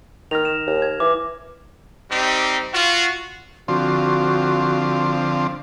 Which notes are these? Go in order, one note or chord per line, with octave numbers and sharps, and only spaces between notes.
D#3 F6 A#6 F7
E7
D#2
G#6
E3 D6
G3 C4 D#4 G4
F4 F#4
D3 F3 C4 F#4